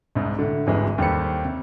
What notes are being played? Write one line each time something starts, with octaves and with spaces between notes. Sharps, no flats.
C2 G#2
A2 D3
G#1 D2 G#2 E3 G3 G#3
D#2 G3 G4 A4 C5 C#7
C3